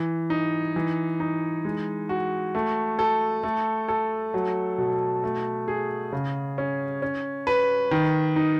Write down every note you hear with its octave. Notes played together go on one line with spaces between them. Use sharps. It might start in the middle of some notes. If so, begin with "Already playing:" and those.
Already playing: E3
D#4
E3
D#4
G#3
F#4
A3
A4
A3
A4
F#3
B2
A3
G#4
C#3
C#4
C#4
B4
D#3
D#4